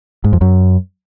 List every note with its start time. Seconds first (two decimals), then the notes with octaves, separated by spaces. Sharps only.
0.24 G#2
0.33 F2
0.41 F#2